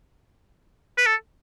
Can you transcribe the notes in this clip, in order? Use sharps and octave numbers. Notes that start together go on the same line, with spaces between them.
B4
A4